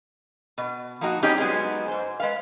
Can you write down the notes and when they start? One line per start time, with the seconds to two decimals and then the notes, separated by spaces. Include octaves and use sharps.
0.58 B2
1.01 F3 A#3 D#4 F#4
1.23 G3 C4 C#4 D#4 G4 G#4
1.38 F#3 G#3 B3 C#4 D#4 G#4
1.88 G#2 C5
2.20 G#3 B4 F5